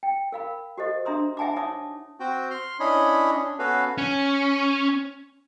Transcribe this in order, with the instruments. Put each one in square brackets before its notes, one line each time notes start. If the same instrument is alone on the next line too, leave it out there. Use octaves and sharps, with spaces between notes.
[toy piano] G5
A#4 F5 B5
F#4 G4 A4 C5 D#5
D4 E5 A#5 C6 D#6
E5 F#5 G#5 A5 B5 D6
D#4 C#5 E5 A5 D6 D#6
[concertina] C4 F#4 G5
C6 F6
C#4 D4 E4 C#5 D#5 B5
C#4 D4
B3 C#4 F#4 A4 B4 F5
[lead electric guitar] C#4